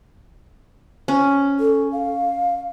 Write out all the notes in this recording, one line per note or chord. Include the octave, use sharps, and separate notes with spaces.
C#4
A4
F5